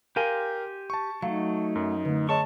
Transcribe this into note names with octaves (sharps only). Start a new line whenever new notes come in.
G4 A#4 F5 G5 G#5 C6
A5 C#6
F#3 A3 D#4 F5
F#2
D3 A3
G#4 C#5 D#5 A5 C#6